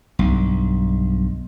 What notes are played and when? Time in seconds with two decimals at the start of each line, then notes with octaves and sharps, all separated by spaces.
0.19 B1 G2